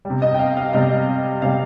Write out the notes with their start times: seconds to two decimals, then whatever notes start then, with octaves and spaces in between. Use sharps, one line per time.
0.05 G3
0.10 C3
0.22 D#5
0.34 G5
0.39 F5
0.57 F5
0.73 C3 G3 D#5
1.42 C3 G3 F5